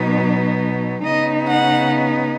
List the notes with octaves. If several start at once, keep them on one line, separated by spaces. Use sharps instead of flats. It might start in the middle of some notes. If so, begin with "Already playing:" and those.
Already playing: B2 F#3 B3 D#4
C#3 B3 D#4 D#5
F#5